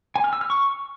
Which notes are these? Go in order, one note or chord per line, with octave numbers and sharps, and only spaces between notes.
G#5
F6
E6
F6
C#6